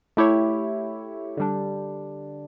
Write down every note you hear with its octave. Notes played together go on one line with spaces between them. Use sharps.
A3 E4 G4 C#5
D3 G3 D4